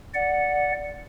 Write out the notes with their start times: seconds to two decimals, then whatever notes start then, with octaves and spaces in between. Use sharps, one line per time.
0.14 D5 F#5